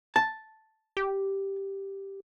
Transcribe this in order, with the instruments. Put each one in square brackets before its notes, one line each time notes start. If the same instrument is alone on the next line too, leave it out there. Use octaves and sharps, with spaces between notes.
[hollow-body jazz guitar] A5
[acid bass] G4